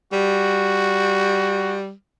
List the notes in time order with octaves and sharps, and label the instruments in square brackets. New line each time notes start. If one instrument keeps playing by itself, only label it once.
[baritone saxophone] G3 [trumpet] F#4